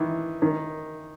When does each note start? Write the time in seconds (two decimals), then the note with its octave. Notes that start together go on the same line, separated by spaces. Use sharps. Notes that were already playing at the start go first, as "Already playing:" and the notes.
Already playing: D#3 E3
0.42 D#3